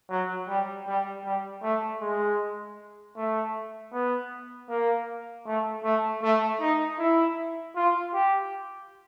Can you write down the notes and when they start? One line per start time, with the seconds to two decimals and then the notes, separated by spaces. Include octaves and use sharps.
0.10 F#3
0.49 G3
0.87 G3
1.24 G3
1.63 A3
2.01 G#3
3.17 A3
3.93 B3
4.69 A#3
5.46 A3
5.84 A3
6.23 A3
6.61 D#4
6.99 E4
7.76 F4
8.14 G4